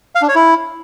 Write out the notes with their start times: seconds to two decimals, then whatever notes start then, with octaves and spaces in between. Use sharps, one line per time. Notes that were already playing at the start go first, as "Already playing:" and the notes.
0.15 F5
0.22 D4
0.29 C#5
0.35 E4